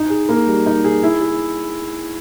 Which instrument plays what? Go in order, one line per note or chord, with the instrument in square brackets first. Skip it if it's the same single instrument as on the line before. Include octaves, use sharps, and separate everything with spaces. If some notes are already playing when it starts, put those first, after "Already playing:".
Already playing: [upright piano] D#4
G#4
A#3
G3
D#4
G#4
E4
G#4